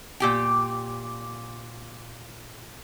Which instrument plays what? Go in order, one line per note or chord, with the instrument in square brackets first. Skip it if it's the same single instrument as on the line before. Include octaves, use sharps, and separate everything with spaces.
[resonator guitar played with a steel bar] A#2 G4 G5